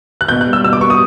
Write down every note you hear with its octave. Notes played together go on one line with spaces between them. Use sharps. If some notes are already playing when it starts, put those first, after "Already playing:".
F#6
B2 G6
F#6
G3
E6
B2 E6
D6
B2 C#6
D#6